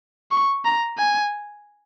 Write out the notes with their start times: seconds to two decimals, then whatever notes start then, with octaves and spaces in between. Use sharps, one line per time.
0.31 C#6
0.65 A#5
0.98 G#5